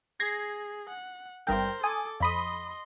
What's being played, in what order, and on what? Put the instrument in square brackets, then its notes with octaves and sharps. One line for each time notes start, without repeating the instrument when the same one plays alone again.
[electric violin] G#4 [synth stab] G#6 A#6 C7
[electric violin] F#5
[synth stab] G#1 G2 G5 [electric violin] A#4 C5
[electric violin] A4 D6 [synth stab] G#5 D#6
[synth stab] F2 B5 D#6 [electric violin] D#5 C6